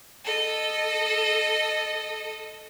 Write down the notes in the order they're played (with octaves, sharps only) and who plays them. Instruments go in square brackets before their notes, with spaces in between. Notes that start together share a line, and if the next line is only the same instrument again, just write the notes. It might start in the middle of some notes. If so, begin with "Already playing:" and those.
[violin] A4 D#5